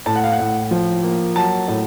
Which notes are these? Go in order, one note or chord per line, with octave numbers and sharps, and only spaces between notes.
A2 A5
F#5
F5
F#5
A2
F3
A#3
F#3 A5
A2